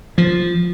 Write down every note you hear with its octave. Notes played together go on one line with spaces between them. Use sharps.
F3